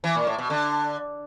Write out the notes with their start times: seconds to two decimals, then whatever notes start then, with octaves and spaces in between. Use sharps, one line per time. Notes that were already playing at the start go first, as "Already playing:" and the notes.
0.04 E3
0.15 A#2
0.27 A2
0.38 B2
0.50 D3